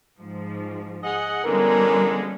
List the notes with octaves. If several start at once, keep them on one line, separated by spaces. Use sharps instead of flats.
G#2 F3
G#4 D#5 F#5
D3 E3 G3 G#3 B3 C#4 A#4